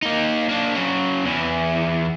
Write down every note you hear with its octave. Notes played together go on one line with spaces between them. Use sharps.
A#3 D#4
A#3 D4
C#3 F#3
E2 E3